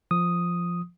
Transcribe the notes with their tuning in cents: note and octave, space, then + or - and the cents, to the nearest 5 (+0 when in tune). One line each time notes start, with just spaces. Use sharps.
F3 -5 D#6 +0